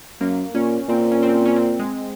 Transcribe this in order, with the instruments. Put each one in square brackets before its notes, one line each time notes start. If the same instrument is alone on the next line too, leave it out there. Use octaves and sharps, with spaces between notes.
[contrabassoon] F#2 [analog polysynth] A#3
[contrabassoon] A#2 [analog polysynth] C#4
[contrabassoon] A#2 [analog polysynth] C4
[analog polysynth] C#4
C4
C#4
C4
G#3